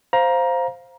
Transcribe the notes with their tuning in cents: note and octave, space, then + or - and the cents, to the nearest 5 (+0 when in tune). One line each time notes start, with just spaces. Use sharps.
C5 +0 F5 +5 A#5 +20